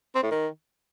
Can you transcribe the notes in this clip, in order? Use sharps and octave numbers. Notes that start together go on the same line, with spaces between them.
C4
A2
D#3